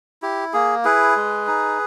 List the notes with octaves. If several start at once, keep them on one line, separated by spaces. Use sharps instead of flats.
E4 G4
A#3 G#4
E4 G#4 B4
G#3
D#4